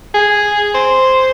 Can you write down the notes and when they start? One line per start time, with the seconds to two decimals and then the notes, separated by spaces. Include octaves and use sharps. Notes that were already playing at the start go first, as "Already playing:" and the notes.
0.14 G#4
0.74 C5